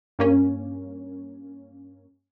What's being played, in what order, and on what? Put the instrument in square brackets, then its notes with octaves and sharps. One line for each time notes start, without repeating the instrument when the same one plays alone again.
[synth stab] G2 A#3 C#4